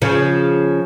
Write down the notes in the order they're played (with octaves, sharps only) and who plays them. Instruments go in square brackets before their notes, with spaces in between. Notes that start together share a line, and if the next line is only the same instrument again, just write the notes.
[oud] C#3 F3